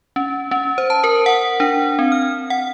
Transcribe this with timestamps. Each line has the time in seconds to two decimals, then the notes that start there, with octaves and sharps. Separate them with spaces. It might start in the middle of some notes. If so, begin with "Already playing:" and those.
0.16 C#4
0.51 C#4
0.78 C5
0.90 A5
1.04 A#4
1.26 F#5
1.60 D4
1.99 C4
2.12 F6
2.50 F#5